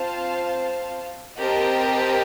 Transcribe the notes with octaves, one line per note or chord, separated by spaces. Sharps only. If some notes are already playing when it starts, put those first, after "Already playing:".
Already playing: C4 F4 C5 F5 A5
C4 G4 A#4 D#5 A5